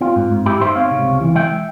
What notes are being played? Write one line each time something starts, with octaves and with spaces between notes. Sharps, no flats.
C4 F4
G#2
G#2
G#2 E4 G4
G#2 C5 E5
C4 C#5 F5
C3
C#2
E3
G#3 E5 G5